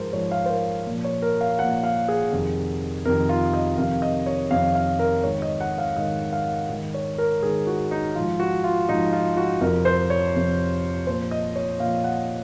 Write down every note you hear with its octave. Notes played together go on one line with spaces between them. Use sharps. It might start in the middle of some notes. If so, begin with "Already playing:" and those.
Already playing: G#2 F3 G#4 A#4 C5
G#2 F3 C#5
F5
C5
A#4
A#2 F3
C#5
A#4
F5
A#2 F3 F#5
F5
G#4
F2 C3 D#3
F2 C3 D#3 A#4
F4
D#5
F2 C3 D#3 F5
D#5
C#5
F2 C3 D#3 F5
F5
A#4
G#2 D#3 C#5
D#5
F#5
F5
G#2 D#3 D#5
F5
G#2 D#3
C#5
A#4
G#2 D#3 G#4
F#4
D#4
G#2 F3 F4
F#4
F4
G#2 F3 D#4
F4
F#4
F2 C3 F3 A#4
C5
C#5
F2 C3 F3
A#2 F3 C5
D#5
C#5
A#2 F3 F5
F#5